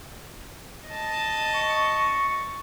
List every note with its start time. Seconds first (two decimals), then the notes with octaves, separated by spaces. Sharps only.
0.88 D#5 A5
1.53 C#6